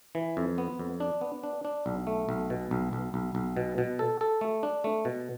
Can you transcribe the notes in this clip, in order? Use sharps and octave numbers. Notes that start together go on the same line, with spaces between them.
E3
F2
B3
F2
D4
B3
D4
D4
B1
A3
B1
B2
B1
B1
B1
B1
B2
B2
A4
A4
A3
D4
A3
B2